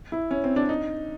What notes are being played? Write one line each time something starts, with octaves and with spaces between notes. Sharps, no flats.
E4
C#4
C4
D4
D#4